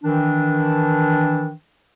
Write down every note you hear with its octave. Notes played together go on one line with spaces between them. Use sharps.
D#3 E3 D4